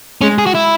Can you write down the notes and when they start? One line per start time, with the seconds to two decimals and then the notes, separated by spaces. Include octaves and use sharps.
0.21 G#3 C#4
0.38 G#4
0.46 F#4
0.55 E4